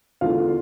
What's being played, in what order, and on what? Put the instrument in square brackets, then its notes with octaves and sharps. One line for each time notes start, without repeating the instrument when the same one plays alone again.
[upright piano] E2 D3 A3 F4 F5